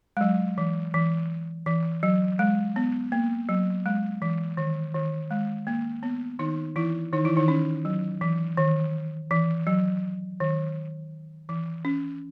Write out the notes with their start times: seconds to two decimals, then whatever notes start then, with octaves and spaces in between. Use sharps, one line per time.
0.17 G#3
0.21 F#3
0.58 E3
0.94 E3
1.66 E3
2.03 F#3
2.39 G#3
2.76 B3
3.12 A#3
3.49 F#3
3.86 G#3
4.22 E3
4.57 D#3
4.95 D#3
5.31 G#3
5.67 A#3
6.03 B3
6.39 D#3 D#4
6.76 E3 E4
7.13 D#3 D#4
7.25 E3 E4
7.37 D#3 D#4
7.48 C#4
7.85 F#3
8.21 E3
8.57 D#3
9.31 E3
9.67 F#3
10.40 D#3
11.49 E3
11.85 C#4